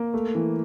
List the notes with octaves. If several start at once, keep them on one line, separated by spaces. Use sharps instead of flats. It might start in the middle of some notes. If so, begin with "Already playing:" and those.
Already playing: A#3
A3
E3